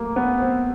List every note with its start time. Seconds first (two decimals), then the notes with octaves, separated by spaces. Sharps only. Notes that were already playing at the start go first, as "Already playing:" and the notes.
Already playing: A3 A#3
0.16 B3
0.40 C4